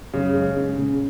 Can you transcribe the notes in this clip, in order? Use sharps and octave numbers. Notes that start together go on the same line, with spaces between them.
F#2 C#3
G#3
C#4
C#3